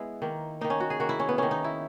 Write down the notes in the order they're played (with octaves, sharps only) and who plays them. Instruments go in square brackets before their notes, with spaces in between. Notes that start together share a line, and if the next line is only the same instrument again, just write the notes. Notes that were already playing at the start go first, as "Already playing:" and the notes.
Already playing: [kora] G#3 B3 E4
D#3 A#3
D#3 A#3 D#4
C#4
F#4
G#4
D#3 A#3 F#4
E4
C#4
B3
D#3 A#3 C#4
D#4
E4